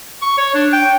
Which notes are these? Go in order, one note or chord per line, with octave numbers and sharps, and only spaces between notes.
C#6
C#5
D4
G5